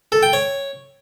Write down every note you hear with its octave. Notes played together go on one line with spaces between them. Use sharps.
A4
G5
C#5